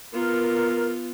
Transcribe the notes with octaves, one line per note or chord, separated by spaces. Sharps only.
B3 F4 A#4